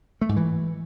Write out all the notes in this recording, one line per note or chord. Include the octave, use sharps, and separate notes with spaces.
A3
G#2
E3